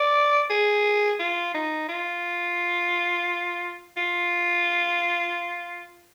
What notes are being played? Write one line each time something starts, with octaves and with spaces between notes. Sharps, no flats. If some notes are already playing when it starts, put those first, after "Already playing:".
Already playing: D5
G#4
F4
D#4
F4
F4